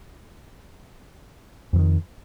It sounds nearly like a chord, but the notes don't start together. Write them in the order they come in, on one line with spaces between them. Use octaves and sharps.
F2 E3 D#3